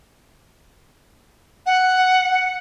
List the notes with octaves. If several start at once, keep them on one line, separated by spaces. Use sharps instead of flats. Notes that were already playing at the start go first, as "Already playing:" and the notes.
F#5